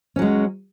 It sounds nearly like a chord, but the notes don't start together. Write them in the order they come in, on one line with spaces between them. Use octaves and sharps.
C#4 F#3 G#3